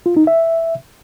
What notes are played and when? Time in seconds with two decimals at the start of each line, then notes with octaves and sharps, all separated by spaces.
0.06 F4
0.17 D#4
0.27 E5